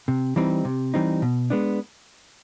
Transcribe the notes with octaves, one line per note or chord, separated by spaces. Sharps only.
C3
E3 G3 C4 D#4
C3
E3 G3 C4 D#4
B2
G#3 B3 D4